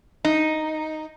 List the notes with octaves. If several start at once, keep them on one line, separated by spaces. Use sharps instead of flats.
D#4